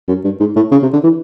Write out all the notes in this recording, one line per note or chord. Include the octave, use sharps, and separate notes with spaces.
F#2
G2
G#2
A2
C#3
C3
D3
E3